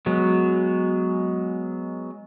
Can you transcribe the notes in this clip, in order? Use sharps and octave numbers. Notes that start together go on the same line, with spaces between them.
F#3 G#3 B3